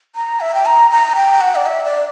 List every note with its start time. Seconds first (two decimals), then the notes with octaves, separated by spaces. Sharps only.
0.16 A#5
0.40 E5
0.54 G5
0.66 A#5
0.91 A#5
1.16 G5
1.41 F#5
1.55 D5
1.66 E5
1.84 D5